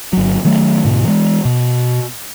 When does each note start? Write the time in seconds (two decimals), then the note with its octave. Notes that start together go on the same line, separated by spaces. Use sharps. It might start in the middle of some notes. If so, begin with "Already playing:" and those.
0.13 G1 F#3
0.45 D#3 F#3 A3
0.84 D2 G#2 B2
1.04 E3 G#3
1.45 B2